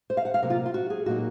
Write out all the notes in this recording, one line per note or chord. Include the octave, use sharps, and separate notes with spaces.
C5
F5
F#5
F5
C3 F#3 A#3 A#4
F4
F4
F#4
G#4
A#2 F#3 A#3 D#4 F#4